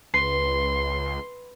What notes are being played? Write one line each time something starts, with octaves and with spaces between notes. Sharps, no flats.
C#2 B4 C6 C7